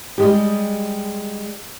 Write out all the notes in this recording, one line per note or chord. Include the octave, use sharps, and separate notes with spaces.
G3 G#3 G4